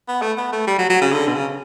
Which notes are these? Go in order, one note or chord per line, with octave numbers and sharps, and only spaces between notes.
B3
A3
B3
A3
G3
F#3
F#3
C#3
D3
B2
C#3